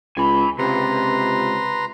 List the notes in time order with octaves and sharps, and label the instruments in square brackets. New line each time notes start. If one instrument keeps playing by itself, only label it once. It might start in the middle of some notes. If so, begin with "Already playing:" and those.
[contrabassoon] C#2 [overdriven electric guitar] G#5 B5
[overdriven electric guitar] C#2 [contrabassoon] C3 [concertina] B4 A#5 C6